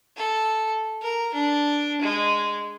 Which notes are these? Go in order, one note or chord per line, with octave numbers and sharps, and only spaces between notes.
A4
A#4
D4
G#3